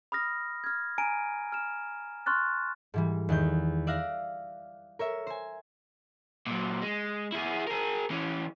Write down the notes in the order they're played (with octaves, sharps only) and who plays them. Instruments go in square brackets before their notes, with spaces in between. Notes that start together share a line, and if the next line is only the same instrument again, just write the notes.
[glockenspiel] B5 D#6 F6 A#6
F6 G#6
G#5 A#5 D7 D#7
F6 E7
C6 C#6 F6 F#6 A6
[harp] G#2 E3 G3
E2 D#3 G6
D5 E5 F5 F#6 A#6
A#4 C#5 E5
C5 G#5
[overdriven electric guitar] A#2 F#3
G#3
E4 G#4
G#4 A#4
E3 C#4